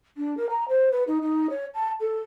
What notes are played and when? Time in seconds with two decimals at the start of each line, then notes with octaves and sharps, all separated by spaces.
0.17 D4
0.37 A#4
0.50 A#5
0.68 C5
0.92 B4
1.07 D#4
1.22 D#4
1.50 C#5
1.75 A5
2.00 A4